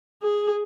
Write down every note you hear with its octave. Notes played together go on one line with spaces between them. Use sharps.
G#4